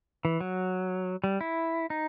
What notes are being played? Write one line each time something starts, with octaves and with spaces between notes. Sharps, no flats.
E3
F#3
G3
E4
D#4